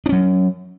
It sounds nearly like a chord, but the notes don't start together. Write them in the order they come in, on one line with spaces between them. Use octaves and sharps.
D4 C#4 F#3